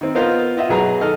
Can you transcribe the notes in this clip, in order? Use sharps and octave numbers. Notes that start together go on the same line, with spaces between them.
D#3 C4
B3 F4 A#4 C5 D#5 F5
F4 D#5 E5 F#5
B2 F#3 G#4 B4 A#5
D#3 A4 D#5 F6